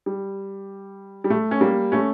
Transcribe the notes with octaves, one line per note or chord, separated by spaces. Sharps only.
G3
G3
A3
C#4
G3 A#3
A3 C#4